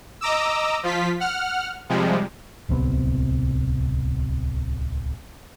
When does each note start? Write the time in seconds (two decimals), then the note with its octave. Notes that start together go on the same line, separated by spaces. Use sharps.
0.21 D#5 A#5 D6 E6
0.83 F3 F4 B6
1.20 F#5 F6
1.89 C3 F3 G3 G#3
2.69 D1 C2 C3 B3